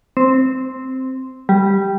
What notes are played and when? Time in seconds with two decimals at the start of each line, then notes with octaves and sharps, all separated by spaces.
0.17 C4
1.49 G3